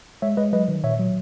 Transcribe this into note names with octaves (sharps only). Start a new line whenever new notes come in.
G#3 C#5 E5
G#3 B4 D#5
F#3 B4 D#5
D#3
A#2 C#5 E5
F#3